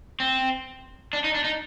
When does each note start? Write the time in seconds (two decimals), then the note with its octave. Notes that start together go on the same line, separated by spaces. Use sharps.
0.20 C4
1.13 D4
1.24 D#4
1.34 D4
1.44 D#4